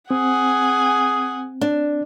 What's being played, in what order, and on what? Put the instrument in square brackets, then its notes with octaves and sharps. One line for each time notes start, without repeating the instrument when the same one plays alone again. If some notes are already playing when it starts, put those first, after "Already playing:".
[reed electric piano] C4 [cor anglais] G#4 [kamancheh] F#5 G#5
[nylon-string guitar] D4